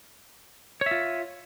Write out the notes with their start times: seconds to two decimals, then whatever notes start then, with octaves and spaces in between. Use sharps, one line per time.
0.81 C#5
0.86 E5
0.91 F4